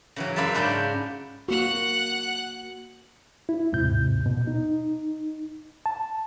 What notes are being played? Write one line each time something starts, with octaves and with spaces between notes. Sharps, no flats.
C#3 E3 F#3
F#2 F4 B4 D5 E5 A5
G#2 C#3 D4 D5 G5
A#3 F#4 F#5 F#6
E4
D#2 G#2 C3 G6
B2
D#4
A5